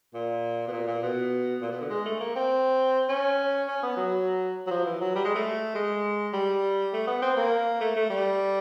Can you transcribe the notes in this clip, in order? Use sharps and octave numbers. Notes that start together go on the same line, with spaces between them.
A#2
B2
A#2
A#2
B2
A#2
B2
D3
G#3
A3
A#3
C4
C#4
C#4
B3
F#3
F#3
F3
E3
F#3
G3
G#3
A3
G#3
G3
A3
B3
C4
A#3
A3
A3
G3